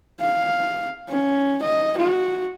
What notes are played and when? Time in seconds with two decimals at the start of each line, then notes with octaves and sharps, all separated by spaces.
0.21 F5
1.09 C#4
1.62 D#5
1.98 F#4